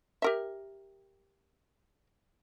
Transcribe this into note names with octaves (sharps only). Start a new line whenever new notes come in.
G4 A#4 E5